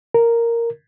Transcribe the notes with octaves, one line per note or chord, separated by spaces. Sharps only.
A#4